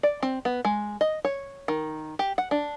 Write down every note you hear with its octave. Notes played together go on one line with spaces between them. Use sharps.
D5
C4
B3
G#3
D#5
C#5
D#3
G4
F#5
D4